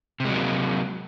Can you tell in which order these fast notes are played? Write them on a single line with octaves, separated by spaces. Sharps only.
C3 G#3 F#3 A#3